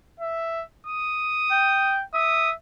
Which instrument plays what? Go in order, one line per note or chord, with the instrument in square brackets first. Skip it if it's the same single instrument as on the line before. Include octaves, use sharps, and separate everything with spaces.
[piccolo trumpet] E5
D#6
[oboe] G5
[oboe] E5 [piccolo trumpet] D#6